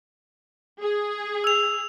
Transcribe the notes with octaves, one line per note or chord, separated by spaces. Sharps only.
G#4
E6 F7